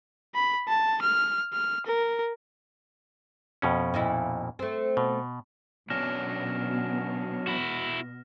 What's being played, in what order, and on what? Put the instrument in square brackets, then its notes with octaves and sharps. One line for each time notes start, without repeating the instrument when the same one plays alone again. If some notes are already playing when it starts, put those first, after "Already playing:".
[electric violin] B5
A5
F6
F6
A#4
[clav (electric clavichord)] F2 B2 C#4
[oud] A#2 D#4 E4
A3 C4
[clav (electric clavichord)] B2
[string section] B2 [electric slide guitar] F#3 C#4 D4 [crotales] F6 A#6 E7
[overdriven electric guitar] E4 F#4